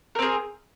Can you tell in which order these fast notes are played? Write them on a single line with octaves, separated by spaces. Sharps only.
A#4 C4 G#4